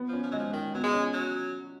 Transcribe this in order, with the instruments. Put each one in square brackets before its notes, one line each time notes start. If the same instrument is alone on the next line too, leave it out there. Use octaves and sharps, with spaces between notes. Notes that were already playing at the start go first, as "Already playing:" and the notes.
Already playing: [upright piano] B3
[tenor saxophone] F3 [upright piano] C#4
[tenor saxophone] F3
[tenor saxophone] F#3 [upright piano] G#3
[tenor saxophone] F3
[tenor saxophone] D#3 [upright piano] G#3
[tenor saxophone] F#3 [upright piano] B3
[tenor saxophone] G#3
[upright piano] C#4
[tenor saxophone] F#3